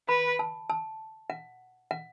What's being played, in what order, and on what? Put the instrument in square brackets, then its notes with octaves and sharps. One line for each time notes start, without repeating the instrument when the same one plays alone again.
[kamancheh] B4 [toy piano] B5
[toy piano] A5
A5
F#5
F#5